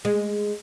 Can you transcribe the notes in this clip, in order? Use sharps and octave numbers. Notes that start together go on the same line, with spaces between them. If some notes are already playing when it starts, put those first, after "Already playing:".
G#3